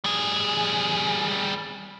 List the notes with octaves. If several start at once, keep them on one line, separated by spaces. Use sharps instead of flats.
G3 G#4